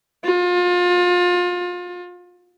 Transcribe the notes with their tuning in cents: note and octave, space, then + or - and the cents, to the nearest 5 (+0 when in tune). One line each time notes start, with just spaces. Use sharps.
F4 +30